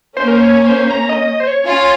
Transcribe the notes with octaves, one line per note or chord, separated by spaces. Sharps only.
A#3 C#4 C5
A#4
C5
C#5
C5
A#5
D#5
D#5
C5
C#5
C#4 F4